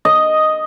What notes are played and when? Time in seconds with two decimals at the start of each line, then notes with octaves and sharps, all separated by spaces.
0.05 D#5